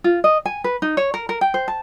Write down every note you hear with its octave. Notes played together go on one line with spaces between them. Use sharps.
F4
D#5
G#5
B4
D#4
C#5
A#4
A#4
G5
C5
A5